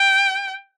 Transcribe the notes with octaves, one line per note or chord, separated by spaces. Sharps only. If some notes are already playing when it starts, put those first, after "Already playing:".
Already playing: G5